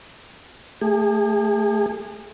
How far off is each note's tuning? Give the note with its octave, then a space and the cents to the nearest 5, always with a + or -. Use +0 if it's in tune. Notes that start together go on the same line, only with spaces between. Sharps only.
A3 +0 G#4 -35